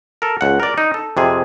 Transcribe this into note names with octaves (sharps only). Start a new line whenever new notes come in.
A4 A#4
C#2 F#5
A#4 D5
D#4
A4
F2 C3 G#4